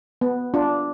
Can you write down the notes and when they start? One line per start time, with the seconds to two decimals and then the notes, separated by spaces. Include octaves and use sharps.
0.21 B3
0.54 D4 F4